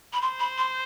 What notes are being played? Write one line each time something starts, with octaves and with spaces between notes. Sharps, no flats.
B5
C5 C6
B5
C6